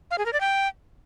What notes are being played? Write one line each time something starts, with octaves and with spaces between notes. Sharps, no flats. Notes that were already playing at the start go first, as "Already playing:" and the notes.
F5
G#4
A#4
D5
G5